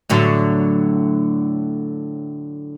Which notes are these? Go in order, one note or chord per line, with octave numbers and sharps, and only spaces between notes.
A2 D3 F#3